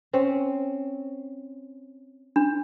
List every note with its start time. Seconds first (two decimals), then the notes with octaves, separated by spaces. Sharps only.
0.13 C4 C#4
2.36 D4